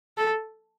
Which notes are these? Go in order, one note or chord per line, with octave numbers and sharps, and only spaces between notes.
A4